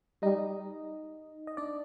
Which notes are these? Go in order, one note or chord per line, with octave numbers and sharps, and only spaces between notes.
G3 D#4 D#5
D#5
D4 D5